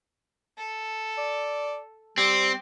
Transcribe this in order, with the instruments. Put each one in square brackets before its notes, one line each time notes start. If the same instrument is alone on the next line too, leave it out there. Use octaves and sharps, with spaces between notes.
[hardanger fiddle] A4
[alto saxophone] D5
[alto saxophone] G3 [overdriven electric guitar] C4 [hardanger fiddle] D6